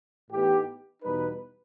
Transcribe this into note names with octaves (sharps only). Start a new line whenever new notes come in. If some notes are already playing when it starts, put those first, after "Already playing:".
A2 E3 B3 D#4 G4
E2 B2 G3 D#4 B4